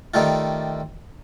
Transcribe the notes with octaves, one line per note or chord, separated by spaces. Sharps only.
D#3 G3 A3 F4